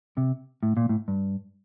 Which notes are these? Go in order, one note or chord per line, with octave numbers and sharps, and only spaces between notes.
C3
A2
A#2
A2
G2